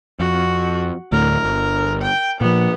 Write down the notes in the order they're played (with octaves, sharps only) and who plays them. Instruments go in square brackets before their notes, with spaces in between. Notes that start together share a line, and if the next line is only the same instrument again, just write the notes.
[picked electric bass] F2 [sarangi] F#4
[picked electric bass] D2 A2 [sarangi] A#4
[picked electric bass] G1
[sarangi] G5
[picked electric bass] A#2 F3 [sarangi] B3